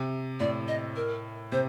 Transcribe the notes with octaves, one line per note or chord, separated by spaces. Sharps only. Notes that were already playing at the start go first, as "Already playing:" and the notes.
Already playing: C3
A2 D5
D#5
A#4
C3 C5